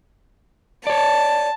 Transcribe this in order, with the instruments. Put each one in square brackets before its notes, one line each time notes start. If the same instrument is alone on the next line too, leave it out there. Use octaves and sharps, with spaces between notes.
[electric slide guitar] C#5 D5 [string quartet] A5